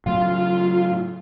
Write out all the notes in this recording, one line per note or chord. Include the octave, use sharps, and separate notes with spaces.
A2 C#3 F#3 F4